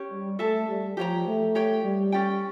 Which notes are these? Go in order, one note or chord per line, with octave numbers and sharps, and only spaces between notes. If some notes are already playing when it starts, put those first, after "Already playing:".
Already playing: C#4 G4 C#5
G3
A3 A4 E5 A5
G3
F3 G4 C#5 G5 A#5
A3
G4 C#5 G5
G3
C#4 G4 D5 G5